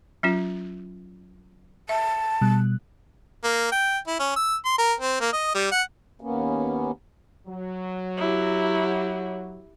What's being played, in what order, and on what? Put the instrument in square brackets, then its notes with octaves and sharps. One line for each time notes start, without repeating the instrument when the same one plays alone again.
[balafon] F#3 C#4 F4
[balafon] E5 [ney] A5
[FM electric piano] B2 G3 F#6
[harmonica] A#3
G5
E4
C#4
E6
C6
A#4
C4
A#3
D#5
G3
F#5
[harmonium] D#2 A#3 B3 C#4
[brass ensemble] F#3
[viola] E4 G4